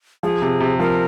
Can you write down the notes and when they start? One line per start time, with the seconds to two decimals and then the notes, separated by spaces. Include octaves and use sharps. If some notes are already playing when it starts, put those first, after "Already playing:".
0.23 F3 G#4
0.42 C3
0.60 C3
0.79 F3 A#4